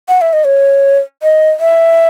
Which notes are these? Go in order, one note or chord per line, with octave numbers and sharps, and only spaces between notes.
F#5
E5
D#5
C#5
D#5
E5